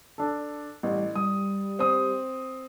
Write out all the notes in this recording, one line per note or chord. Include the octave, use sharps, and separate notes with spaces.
D4 A4
A1 G3
G3 D#6
C4 D#6